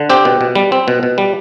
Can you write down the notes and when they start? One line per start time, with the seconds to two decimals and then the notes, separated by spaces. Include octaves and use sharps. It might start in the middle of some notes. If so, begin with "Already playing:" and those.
Already playing: D3
0.10 C4 G4
0.25 B2
0.41 B2
0.55 G3
0.72 C4
0.88 B2
1.03 B2
1.18 G3